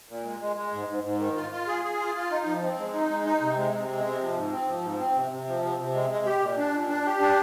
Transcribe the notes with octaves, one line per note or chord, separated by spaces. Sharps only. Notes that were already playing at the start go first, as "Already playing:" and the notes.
A#2
G#3
G#3
G#3
G#2
G#2
G#2
D#3
F4
F4
G#4
G#4
F4
F4
D#4
F3
C4
G#3
D#4
G#3
D#4
C3
G#3
C3
G#3
C3
F3
G#2
C4
F3
G#2
C4
C3
C3
F3
C3
C3
G#3
G#3
G4
A#2
D4
A#2
D4
G4
D4